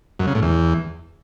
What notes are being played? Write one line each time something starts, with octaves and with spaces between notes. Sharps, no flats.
F#2
C#3
A2
E2